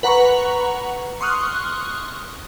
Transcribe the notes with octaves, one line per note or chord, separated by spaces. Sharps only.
B4 F#5 A#5 B5 C#6
C6 C#6 D#6 F6 F#6